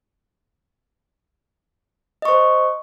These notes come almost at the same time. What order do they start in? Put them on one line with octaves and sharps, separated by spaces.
D#5 C#6 C5